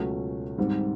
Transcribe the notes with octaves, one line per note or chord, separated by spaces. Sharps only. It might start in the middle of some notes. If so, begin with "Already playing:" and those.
Already playing: C#2 B2 F#3 A3 C#4
G#2 D#3 G3 C4